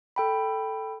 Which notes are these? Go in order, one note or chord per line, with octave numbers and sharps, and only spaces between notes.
A4 G5 B5